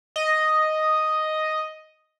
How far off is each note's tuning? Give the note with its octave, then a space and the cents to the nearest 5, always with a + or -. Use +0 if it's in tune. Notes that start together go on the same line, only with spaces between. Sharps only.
D#5 +0